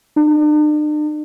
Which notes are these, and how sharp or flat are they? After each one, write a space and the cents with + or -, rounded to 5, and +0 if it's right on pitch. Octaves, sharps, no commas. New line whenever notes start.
D4 +45